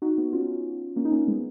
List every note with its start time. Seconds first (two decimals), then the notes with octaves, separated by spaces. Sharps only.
0.02 D#4 F#4
0.18 B3 D#4
0.33 C#4 F4
0.96 A#3 C#4
1.05 D#4
1.12 A#3 C#4
1.27 G#3 B3